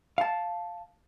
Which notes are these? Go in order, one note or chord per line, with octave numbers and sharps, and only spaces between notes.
F5 A5